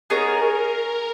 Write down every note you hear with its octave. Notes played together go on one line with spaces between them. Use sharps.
B3 D#4 G#4 A#4 C#5